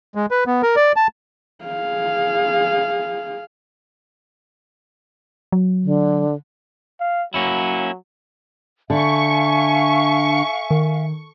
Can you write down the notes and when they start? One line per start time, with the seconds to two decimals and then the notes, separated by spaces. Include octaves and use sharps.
0.15 G#3
0.31 B4
0.47 B3
0.63 A#4
0.76 D5
0.96 A5
1.65 G#4 F5
5.52 F#3
5.83 D3
7.00 F5
7.34 F#3 A#3 C#4 E4
8.90 D3 E5 F5 G#5 C#6
10.71 D#3